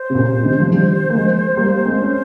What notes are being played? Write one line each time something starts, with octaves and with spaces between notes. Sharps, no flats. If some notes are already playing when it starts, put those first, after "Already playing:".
Already playing: C5
C3
A#2 C#3
C3 D#3
F3
D#3 G3
A#3
F3 G#3
G3 A#3
A#3
G#3 C4
C#4